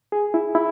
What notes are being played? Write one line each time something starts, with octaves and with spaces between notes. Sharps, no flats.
G#4
E4
E4